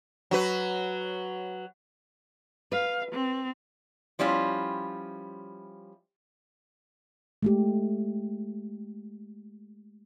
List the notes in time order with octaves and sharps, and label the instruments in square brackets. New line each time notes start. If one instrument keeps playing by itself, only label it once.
[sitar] F#3 F#4 B4
[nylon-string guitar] B4 [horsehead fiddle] F5
[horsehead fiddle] C4
[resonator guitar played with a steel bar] F3 G3 C#4 E4 F4
[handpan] G#3 A3 G4